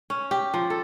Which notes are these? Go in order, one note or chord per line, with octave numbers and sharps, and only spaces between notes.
C#4
G4
F3
A4